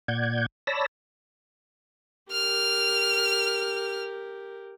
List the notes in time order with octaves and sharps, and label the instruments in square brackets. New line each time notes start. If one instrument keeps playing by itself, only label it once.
[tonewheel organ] A#2 D5 F#5 G6 G#6
C#5 D5 A5 B5 E6 A#6
[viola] G4 A#4 [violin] F6